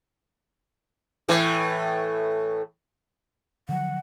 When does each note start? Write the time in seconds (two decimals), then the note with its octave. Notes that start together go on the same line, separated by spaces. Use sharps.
1.28 A2 E3 A3
3.69 D3 F3 F#3 F#5